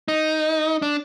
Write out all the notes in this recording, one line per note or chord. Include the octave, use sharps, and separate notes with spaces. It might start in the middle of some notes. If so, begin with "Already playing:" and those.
D#4
D4